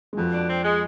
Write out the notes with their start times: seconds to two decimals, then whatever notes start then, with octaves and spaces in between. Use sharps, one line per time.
0.13 G#3
0.17 F2 B2 F3
0.33 D4
0.49 C4
0.64 G#3